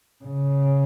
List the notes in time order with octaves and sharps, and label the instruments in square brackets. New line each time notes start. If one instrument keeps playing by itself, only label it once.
[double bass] C#3